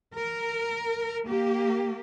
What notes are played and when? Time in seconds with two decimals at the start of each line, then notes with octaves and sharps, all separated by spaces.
0.14 A#4
1.26 A#3 G4